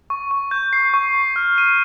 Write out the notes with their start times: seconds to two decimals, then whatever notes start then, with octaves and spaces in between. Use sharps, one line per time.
0.10 C#6
0.31 C#6
0.51 G6
0.73 C7
0.94 C#6
1.15 C#6
1.36 F6
1.58 D#7